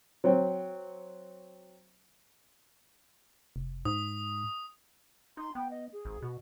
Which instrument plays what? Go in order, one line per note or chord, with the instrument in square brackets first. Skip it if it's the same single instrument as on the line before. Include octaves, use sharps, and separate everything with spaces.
[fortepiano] F#3 C4
[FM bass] F1
[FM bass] G#2 [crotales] D#6
[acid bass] D#4 [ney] C6
[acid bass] B3 [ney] G5
[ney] D#5
G#4
[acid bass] G#1
[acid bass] B2 [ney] F#4